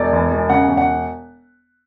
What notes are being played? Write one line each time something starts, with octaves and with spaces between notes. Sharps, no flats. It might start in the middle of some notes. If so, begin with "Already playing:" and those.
Already playing: E1 D5
E2
E1
C#3 F#5
E1
F#5